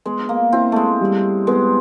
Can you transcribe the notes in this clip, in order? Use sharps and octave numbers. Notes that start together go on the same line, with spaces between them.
G#3 B3
A#3
C4 E4
G#3 A3
G3
G#3 B3